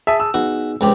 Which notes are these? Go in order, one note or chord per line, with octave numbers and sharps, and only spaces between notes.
G#4 E5 A5 D#6
E6
B3 D#4 F#4 G#4
C#2 C3 G4